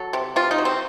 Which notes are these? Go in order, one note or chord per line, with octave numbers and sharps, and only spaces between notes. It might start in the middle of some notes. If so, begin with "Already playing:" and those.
Already playing: F#3 A4
C3
C3 F4
D#4
F#3
C4